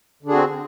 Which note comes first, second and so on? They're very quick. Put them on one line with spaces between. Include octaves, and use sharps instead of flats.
D3 D4 G#4 F#4 C4